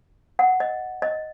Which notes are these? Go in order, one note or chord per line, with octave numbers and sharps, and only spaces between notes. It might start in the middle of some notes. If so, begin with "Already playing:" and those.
F#5
D#5
D#5